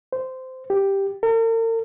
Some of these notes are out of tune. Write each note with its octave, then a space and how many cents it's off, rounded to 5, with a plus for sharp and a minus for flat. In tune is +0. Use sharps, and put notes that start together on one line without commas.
C5 -15
G4 +0
A#4 -45